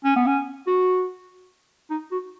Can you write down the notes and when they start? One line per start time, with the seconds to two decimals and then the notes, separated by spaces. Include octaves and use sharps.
0.04 C#4
0.16 B3
0.27 C#4
0.67 F#4
1.90 D#4
2.12 F#4